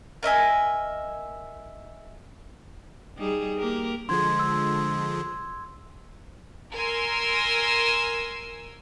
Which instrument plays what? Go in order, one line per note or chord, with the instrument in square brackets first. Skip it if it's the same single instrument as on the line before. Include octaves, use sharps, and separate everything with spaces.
[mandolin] A#4 D#5 E5 G#5
[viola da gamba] G3 D#4 G#4
A#3 G4 A#4
[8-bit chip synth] D3 F3 G#3 [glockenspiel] C6 G#6
[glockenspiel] E6
[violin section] A#4 G#5 C6 E6